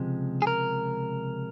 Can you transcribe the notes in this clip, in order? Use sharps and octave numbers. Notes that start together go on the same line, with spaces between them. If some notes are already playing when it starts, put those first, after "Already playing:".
Already playing: C#2 C3 F3 G#3
G#4
A#4